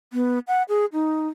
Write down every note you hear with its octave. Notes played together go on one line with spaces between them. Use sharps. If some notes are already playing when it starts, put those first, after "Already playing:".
B3
F#5
G#4
D#4